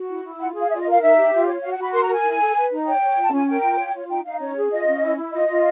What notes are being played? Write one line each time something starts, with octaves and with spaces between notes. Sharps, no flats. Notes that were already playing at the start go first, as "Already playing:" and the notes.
Already playing: F#4
E4
E4
F4 F#5
G#4
F5
F4 E5
D5
D#5
A#4
F5
D#4 E5
G4
F4
C#5
F#4 F5
F#5
F#4
B5
A#4 C6
A#5
A#4
G#5
E4
A4
B4
D#4
C#5 G5
C#5
F4
A5
C#4 G#5
A#4 G5
F4
C#5
F4
D#4 G5
D#4 F5
C#4 C#5
G#4
F4 D#5
C#4
E4
E4
F4 D#5
F4